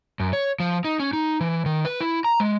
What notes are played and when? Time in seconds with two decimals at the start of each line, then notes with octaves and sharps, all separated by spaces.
0.20 F#2
0.33 C#5
0.60 F3
0.85 D#4
1.00 C#4
1.13 D#4
1.41 E3
1.66 D#3
1.85 B4
2.01 E4
2.24 A#5
2.40 G#3